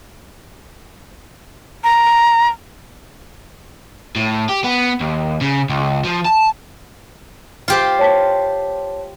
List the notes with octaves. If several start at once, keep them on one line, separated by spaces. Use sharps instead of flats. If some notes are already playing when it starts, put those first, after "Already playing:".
A#5
A2
G4
B3
D#2
C#3
C#2
F3
A5
F4 G4 C5
C#5 A5 B6